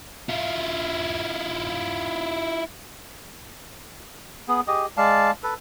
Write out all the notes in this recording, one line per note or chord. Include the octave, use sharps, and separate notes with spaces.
E4 F4
B3 G#4
G4 G#4 D#5
G#3 D5 F5 A5
A4 B4